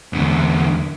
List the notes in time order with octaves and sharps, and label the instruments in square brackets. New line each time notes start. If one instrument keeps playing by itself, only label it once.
[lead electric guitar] E2 D3